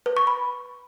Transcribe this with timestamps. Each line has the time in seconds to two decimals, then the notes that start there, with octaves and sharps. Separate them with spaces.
0.06 B4
0.17 C#6
0.27 B5